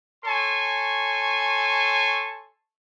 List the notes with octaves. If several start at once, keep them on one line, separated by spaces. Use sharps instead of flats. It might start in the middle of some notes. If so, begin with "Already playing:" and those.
A4 C#5 G#5 C6 C#6